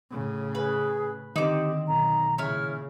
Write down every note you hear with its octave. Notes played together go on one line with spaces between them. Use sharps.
A2 C#3
G#4 B4
D3 D#3 C4 D#4 G4 D6
B1 A#5
A#2 C#3 E4 C#5 F6